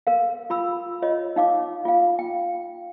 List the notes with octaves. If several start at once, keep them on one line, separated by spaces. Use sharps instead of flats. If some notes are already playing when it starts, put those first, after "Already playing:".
A#4 F5
F4 B5 E6
F4 C#5 D#5
D#4 F5 D6
F4 F5
G5